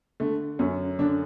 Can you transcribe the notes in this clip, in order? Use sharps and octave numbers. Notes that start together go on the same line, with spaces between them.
D3 A3
F#2 C#4
D3 D4